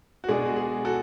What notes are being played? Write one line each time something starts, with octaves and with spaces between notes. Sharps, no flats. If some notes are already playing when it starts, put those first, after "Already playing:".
F#4
B2 G#3 D4 G#4
F#4
G#4
F#4 A4